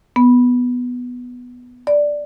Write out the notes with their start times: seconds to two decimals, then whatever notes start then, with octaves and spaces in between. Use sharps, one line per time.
0.16 B3
1.87 D5